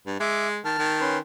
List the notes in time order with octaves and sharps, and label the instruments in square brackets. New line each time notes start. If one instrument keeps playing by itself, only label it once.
[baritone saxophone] G2
[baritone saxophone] G#3 [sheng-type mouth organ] E5 D6
[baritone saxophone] D#3 [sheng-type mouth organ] A5 F6
[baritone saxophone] D#3
[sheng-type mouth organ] C#4 B4 C6